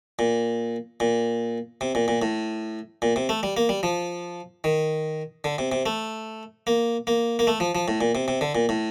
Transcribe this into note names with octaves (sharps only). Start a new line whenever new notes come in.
A#2
A#2
C3
A#2
A#2
A2
A#2
C3
A3
G3
A#3
G3
F3
D#3
D3
C3
C3
A3
A#3
A#3
A#3
A3
F3
F3
A2
A#2
C3
C3
D3
A#2
A2